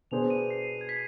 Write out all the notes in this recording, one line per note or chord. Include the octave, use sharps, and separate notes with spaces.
B2 B3 D4 G#4 C5 F7
D#7
C7
G#6
B6